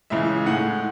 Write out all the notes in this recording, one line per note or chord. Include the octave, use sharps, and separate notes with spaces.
C#2 C#3 E3 G#3 E5
A2 G#3 F#5